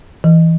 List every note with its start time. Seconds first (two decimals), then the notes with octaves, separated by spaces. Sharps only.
0.24 E3